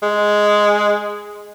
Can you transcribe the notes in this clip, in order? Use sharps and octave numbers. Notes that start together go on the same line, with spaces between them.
G#3